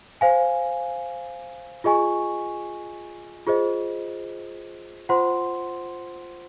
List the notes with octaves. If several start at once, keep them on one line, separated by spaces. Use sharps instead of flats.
C5 F5 G#5
F4 G#4 D#5 G#5 C#6
F4 G#4 C5 D#5
F4 C5 F#5 C6